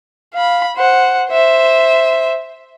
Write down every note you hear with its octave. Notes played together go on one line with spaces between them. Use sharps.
F5 B5
C5 F#5
C5 E5